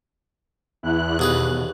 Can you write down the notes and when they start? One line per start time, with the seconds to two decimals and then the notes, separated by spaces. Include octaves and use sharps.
0.83 E2 E4 F#6
1.19 D#2 B2 G#4 B4